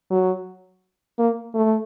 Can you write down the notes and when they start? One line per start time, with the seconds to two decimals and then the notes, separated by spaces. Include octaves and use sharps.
0.11 F#3
1.19 A#3
1.54 A3